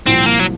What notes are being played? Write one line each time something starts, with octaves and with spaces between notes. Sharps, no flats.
C2 A#2 F3 C4
A#3
F#3